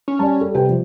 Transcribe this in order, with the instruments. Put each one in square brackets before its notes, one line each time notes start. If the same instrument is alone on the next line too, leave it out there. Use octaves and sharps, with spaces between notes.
[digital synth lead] C#4
[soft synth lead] G3 [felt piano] D5 A5
[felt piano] A4
[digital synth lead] C3 [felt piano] G4 B4 G5
[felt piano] F3